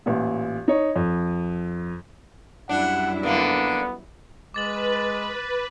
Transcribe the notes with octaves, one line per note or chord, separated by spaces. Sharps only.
A1 A#2
D#4 C#5
F2
F#2 G3 D4 E4 F#5
D3 A#3 B3
G#3 B4 D6 A6 F#7